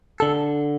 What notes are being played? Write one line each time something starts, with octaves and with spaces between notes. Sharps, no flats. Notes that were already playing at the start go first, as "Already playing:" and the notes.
D3 A4